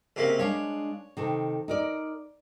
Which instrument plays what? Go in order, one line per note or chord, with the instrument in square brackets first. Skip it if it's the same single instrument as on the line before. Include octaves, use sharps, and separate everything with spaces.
[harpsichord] C#2 C3 A#3
[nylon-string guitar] G#3 D4 F5 [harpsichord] C#5
[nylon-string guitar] C3 D#3 A4
D#4 A#4 D5